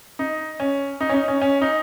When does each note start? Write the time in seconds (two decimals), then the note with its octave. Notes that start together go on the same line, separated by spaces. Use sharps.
0.19 D#4
0.60 C#4
1.01 D#4
1.09 C#4
1.14 D#4
1.28 C#4
1.41 C#4
1.61 D#4